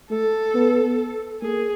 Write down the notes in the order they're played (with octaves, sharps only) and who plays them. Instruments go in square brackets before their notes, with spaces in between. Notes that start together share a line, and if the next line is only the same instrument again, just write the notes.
[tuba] A3 [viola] A4
[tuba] B3
[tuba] A#3 [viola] G#4